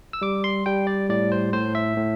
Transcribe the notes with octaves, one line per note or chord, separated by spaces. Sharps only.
E6
G3 D6
C6
G3 G5
D5
A2 D5
C5
A2 C5
E5
A2